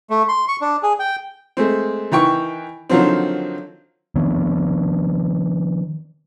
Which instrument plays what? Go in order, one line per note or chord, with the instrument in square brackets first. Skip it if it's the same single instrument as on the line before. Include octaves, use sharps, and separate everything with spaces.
[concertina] A3
C6
C#6
D4
G#4
G5
[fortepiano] G#3 A3 C4
D#3 E3 G5 C#6
D3 D#3 F3 F#3 C4
[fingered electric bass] D#3 F3 B3 D4